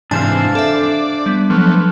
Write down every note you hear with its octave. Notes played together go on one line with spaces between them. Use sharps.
G#2 C3 E3 D4 C5 F5 G#5
A4 D5 E5
G3 B3
F3 F#3 A3 B3